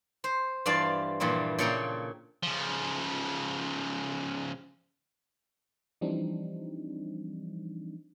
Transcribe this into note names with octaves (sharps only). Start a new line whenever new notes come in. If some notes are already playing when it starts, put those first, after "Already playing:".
C5
G2 E3 F4 D5 F5 A5
G2 A#2 E3 F3 G3
A#2 C#3 A4 G5 A#5 C6
C#3 F3
E3 F3 G3 C4 D4 D#4